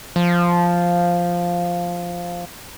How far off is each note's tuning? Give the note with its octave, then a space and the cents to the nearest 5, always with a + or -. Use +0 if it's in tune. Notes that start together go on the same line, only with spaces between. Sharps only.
F3 +0